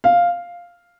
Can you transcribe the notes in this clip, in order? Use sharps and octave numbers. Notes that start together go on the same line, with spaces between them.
F5